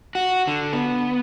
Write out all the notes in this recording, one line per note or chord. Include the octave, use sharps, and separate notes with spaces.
F#4
D3
B3